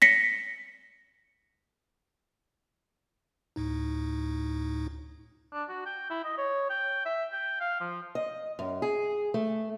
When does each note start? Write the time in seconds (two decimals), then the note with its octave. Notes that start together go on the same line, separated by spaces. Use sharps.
0.02 A#6 B6 C#7
3.56 D2 A2 D#4
5.53 D4
5.69 F#4
5.86 G5
6.10 E4
6.24 D#5
6.38 C#5
6.70 G5
7.06 E5
7.32 G5
7.60 F5
7.80 F3
8.15 D#5
8.59 F#2
8.82 G#4
9.34 A3